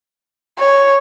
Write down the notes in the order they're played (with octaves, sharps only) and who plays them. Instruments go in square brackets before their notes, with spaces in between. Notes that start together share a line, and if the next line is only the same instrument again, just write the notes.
[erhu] C#5